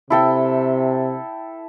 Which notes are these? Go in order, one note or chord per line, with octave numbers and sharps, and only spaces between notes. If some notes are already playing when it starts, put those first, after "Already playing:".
C3 E4 A4 G5